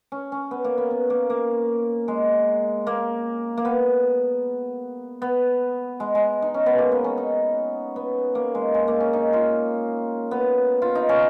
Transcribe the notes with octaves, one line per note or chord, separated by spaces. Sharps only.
C#4
C#4
B3
A#3
B3
B3
A#3
A#3
G#3
A#3
A#3
B3
B3
G#3
G#3
D#4
C#4
B3
A#3
B3
C#4
D#4
B3
A#3
G#3
G#3
A#3
C#4
D#4
F4
B3
F4
D#4
C#4